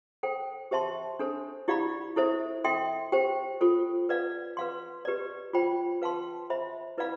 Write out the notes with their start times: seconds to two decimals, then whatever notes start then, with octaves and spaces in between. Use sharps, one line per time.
0.23 A4 C5 G5
0.71 G4 C5 E5 A5 C6
1.19 D4 A4 C5
1.68 E4 G4 D5 F5 B5
2.16 E4 A4 C5 E5
2.64 A4 E5 G5 C6
3.12 G4 C5 G5
3.61 F4 A4 C5
4.09 B4 D5 F5
4.57 B4 F5 C6
5.05 G4 B4 D5
5.53 F4 C5 G5 B5
6.02 B4 F5 A5 C6
6.50 C5 E5 B5
6.98 E4 B4 D5 F5 B5